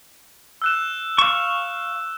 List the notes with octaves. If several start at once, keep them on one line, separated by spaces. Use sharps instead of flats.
E6 F#6 E7
F5 C#6 E7